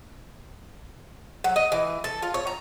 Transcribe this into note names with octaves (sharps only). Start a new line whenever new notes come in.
F#3
D#5
E3
A4
F4
C#5
A#5